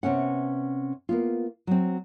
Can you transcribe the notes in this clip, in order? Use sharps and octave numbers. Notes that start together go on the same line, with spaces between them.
C3 B3 C#4 F#5
A#3 B3 F4
F#3 C4